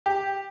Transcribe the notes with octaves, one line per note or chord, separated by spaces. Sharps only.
G4